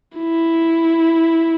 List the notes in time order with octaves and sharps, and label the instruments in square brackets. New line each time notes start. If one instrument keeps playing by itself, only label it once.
[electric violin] E4